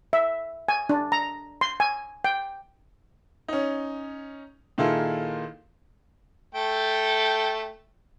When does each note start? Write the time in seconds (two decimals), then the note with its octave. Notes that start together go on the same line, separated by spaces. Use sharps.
0.13 E5
0.68 G#5
0.89 D4
1.12 A#5
1.61 C6
1.80 G#5
2.24 G5
3.48 C#4 D#4
4.78 A#2 D#3 E4 F4 G#4 A4
6.55 A3 A4 G5